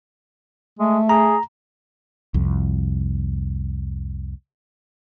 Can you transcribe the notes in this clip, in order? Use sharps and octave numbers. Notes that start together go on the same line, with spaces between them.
G#3 A3
G#4 A#5
C2 F2